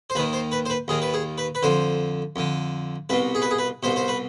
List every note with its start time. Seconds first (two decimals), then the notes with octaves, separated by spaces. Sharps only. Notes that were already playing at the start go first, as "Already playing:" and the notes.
0.10 C5
0.15 D#2 B4
0.19 D#3
0.33 C5
0.52 B4
0.66 C5
0.70 B4
0.88 D#2 D#3 G#4
1.02 B4
1.14 G#4
1.38 B4
1.55 B4
1.63 F2 D3 C5
2.36 F2 D3
3.09 C2 B2 B4
3.35 G#4
3.42 B4
3.51 G#4
3.58 B4
3.83 C2 B2 C5
3.96 C5
4.08 B4